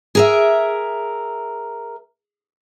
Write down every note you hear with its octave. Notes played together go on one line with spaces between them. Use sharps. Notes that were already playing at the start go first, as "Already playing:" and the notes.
G#4 A#4 E5